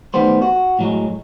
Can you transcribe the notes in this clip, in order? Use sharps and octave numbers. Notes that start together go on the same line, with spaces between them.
D#3 G3 A3 B3 C5
F#4
A2 F#3 G#3